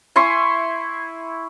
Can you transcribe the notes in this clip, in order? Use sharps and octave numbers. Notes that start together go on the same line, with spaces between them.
E4 G#5 C6 C#6